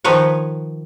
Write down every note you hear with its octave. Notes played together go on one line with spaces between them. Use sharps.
D#3 F3 D#4 B4 C#5